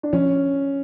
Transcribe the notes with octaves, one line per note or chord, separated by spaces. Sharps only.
D4
F3 C#4